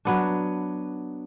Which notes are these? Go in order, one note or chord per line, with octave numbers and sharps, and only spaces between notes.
F#3 B3 D4